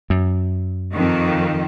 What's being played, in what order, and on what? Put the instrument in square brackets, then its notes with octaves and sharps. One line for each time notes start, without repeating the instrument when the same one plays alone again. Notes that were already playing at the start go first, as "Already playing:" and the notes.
[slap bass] F#2
[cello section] F2 D#3